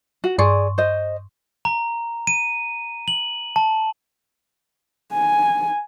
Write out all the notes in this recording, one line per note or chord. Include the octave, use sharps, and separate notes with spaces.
F#4
G2 G#4 D5 C6 C#6
C5 D#5
A#5
D#7
F#7
A5
G#5